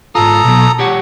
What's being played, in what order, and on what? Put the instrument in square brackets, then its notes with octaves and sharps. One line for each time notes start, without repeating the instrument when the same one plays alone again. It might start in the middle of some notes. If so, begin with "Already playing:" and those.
[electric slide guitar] G#2 F4 [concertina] A4 A#5 D#6
[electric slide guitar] B2 F#3
G4 C#5 F#5